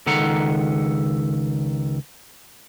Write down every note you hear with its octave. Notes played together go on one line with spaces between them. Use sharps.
C#2 D#3 A4 F#5 A#5